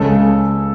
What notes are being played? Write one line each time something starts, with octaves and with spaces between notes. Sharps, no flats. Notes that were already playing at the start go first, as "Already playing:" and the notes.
Already playing: C#2 C#3 G#3 C#4 A4